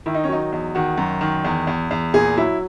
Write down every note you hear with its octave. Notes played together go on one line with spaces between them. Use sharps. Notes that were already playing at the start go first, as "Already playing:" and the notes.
D#3 E4
D#4
C#4
F#3 D#4
E2
D#3 F#4
F#2
D#3
E2
E2
E2
A#2 G#4
F#3 E4